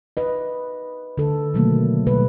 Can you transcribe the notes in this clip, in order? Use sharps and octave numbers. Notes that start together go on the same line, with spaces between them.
B4 D#5
D3 A4
B2 D#3 F#3 A3 A#3
B2 D3 G3 B4